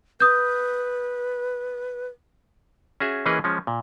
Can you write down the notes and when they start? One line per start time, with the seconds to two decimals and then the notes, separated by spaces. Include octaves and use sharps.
0.20 B4 D#6 G6
3.00 C#4 F#4 G#4 E5
3.26 E3 A#3 C#4 G#4 B4 D#5
3.44 F3 G#3 C#4
3.67 A#2